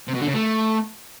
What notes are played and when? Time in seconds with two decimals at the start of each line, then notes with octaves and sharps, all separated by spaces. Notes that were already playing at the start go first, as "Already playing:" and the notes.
0.08 C3
0.14 B2
0.21 D3
0.27 C#3
0.34 A3